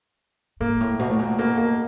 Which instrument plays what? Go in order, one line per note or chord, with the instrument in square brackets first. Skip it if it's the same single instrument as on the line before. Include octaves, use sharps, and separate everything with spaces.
[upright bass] G#2 [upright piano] A#3
[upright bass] A2
B2
A2
A#2
[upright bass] B2 [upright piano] A#3
[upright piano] A#3